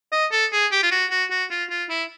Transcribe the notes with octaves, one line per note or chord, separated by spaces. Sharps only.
D#5
A4
G#4
G4
F4
F#4
F#4
F#4
F4
F4
E4